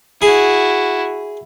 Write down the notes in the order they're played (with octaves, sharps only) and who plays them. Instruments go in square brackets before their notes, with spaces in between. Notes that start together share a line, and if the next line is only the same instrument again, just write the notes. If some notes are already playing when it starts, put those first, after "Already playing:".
[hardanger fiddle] E4 F#4 [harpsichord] G#4